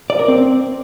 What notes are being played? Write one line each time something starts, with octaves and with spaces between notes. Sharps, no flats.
D5
A#4
C4